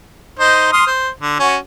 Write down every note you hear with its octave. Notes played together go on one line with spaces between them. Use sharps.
D#4 C5 D#5
C6 D#6 F6
C5
D3
C#4 F#4